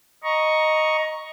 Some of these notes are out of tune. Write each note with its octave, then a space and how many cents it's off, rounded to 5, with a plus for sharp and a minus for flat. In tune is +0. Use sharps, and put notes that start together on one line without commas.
D#5 +0 A#5 +15 C#6 +0